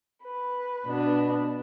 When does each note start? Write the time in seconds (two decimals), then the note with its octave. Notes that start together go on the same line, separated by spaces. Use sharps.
0.23 B4
0.87 B2 B3 D4